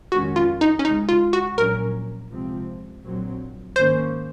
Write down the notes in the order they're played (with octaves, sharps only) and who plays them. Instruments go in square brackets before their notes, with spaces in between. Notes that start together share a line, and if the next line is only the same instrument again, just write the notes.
[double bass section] F2 D#3 G#3 C#4 [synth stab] F#4
[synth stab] F4
D#4
C#4
[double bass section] C#2 C#3 G#3 [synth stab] D#4
[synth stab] F4
F#4
[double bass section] A#1 A#2 F#3 C#4 [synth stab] A#4
[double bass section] C#2 C3 F3 C4
A#1 A#2 F#3 C4
[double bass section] G#2 D#3 A#3 C#4 [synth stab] C5